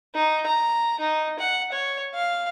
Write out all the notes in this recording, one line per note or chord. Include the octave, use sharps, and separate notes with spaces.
D#4
A#5
D#4
F#5
C#5
F5